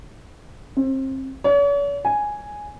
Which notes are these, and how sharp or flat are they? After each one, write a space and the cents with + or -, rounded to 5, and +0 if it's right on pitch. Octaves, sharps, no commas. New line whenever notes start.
C4 +30
C#5 +45
G#5 +0